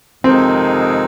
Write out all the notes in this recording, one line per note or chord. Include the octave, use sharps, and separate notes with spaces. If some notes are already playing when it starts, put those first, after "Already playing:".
F2 C3 D#3 G#3 C4 D#4